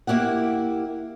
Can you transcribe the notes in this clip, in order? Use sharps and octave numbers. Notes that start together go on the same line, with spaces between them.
A#3 E4 G4 F#5